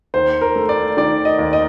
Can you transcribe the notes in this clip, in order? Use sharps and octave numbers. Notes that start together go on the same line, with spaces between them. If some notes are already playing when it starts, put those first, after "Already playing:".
D#2 C5
A#4
A3
D5
D#3 D5
D#5
D#2
D#5